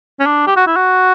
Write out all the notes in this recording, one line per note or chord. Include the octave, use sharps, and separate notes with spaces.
C#4
D4
G4
F#4
E4
F#4